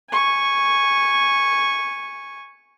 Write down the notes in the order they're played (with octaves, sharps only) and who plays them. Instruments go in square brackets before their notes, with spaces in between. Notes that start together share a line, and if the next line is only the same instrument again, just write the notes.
[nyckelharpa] G#5 C#6